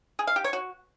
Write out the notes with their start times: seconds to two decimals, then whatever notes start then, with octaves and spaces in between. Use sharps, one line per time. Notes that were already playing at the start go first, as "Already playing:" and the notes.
0.19 G#4
0.27 F5
0.36 G4
0.44 C#5
0.53 F#4